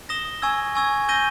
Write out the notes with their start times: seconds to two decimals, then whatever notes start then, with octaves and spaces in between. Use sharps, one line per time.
0.09 D#6 A#6 E7 G7
0.42 G#5 C#6 E6 G#6
0.75 G#5 C#6 E6 G#6
1.09 G6 A#6 D#7 G7